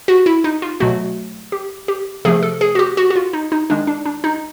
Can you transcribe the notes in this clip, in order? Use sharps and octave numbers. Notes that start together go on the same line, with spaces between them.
F#4
E4
D#4
F4
B2 F#3 A3 F#4
G4
G4
C3 F3 A3 G#4
A4
G#4
F#4
G4
F#4
F#4
F4
D#4
D#4
D#3 G#3 D4
D4
D4
D#4